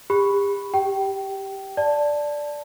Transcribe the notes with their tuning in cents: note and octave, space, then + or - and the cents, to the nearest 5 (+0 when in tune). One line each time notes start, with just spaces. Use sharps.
G4 +40 B5 +0
G4 +0 G5 -20
D5 +0 A5 +0